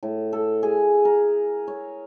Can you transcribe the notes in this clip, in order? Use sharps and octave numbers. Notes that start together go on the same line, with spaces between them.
A2
A4
G#4
A#4
C#5